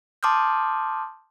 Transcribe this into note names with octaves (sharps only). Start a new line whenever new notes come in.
A5 C6 D6 D#6 F6 G6